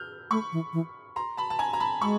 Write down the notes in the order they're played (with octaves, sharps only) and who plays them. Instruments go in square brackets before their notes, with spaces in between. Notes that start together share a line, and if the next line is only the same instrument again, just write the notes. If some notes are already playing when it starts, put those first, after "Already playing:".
Already playing: [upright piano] F6 G6
[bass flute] A3 [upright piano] B5 C#6
[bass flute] E3
E3
[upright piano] A#5 C6
A5 B5
A5
G#5 A#5
A#5
A5 B5
[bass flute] G#3 [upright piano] B5 C#6